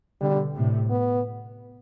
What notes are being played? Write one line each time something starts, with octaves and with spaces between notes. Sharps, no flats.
B2 D3 G3
A2 C3
B3